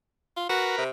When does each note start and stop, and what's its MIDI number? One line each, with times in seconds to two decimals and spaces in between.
0.36 0.49 65
0.50 0.74 66
0.50 0.84 70
0.50 0.84 71
0.78 0.90 48